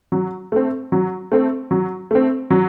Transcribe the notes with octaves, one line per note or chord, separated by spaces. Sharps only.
F#3
A3 C4
F#3
A3 C4
F#3
A3 C4
F#3